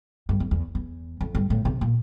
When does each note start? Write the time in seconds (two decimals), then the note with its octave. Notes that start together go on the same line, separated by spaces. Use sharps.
0.29 G2
0.40 F2
0.51 E2
0.75 E2
1.21 F2
1.35 G2
1.50 A2
1.65 C3
1.81 A#2